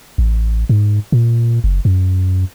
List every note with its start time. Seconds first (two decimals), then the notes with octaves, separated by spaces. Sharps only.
0.18 A1
0.69 G#2
1.12 A#2
1.64 F#1
1.85 F#2